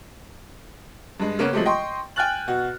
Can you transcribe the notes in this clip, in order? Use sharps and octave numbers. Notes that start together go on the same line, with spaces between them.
G2 G#3
C#3 A#3 B3 C#4
F3 F#3 G#3 A3 C4 G4
D#5 G5 C6 C#6
G5 G#5 F6 F#6 A6 F#7
B2 F#4